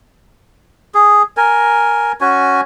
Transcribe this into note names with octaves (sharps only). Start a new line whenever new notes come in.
G#4
A#4 G#5
C#4 F#4 G#5